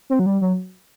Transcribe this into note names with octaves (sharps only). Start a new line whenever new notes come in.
C4
F#3
G3
F#3